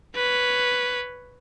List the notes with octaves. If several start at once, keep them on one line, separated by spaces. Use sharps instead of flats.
B4 C#5